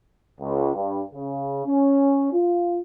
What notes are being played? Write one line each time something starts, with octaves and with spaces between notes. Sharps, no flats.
C#2
G2
C#3
C#4
F4